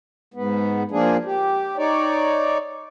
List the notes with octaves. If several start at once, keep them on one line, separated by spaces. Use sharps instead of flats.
G#2 B3
F3 A#3 D4 G#4
G4
D#4 C#5 D5